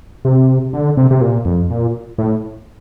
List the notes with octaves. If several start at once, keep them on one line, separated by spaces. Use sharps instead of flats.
C3
D3
C3
C3
A#2
F2
A#2
A2